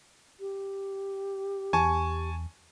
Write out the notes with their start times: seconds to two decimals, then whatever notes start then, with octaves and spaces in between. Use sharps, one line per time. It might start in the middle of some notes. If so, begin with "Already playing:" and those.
0.40 G4
1.73 E2 G#5 A5 C#6